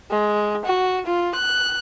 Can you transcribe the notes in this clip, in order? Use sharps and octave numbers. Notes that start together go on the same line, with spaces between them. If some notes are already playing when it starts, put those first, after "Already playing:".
G#3
F#4
F4
F#6